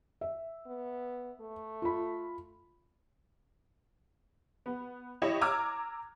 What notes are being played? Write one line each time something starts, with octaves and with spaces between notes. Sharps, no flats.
E5
B3
A3
F4 B5
B3
E4 G4 C#5 D#5 C#6 E7
A#5 D6 E6 F6 G#6